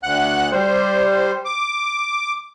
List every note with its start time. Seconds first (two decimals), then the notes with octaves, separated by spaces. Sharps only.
0.03 D2 F#5 F#6
0.52 G3 C5
1.45 D6